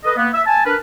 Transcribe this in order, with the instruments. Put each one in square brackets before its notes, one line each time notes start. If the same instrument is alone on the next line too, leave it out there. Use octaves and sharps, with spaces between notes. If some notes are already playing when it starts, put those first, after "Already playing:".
[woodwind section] A4 B4 D#5
A#3 B3
E5
G#5 A5
D4 A#4 B4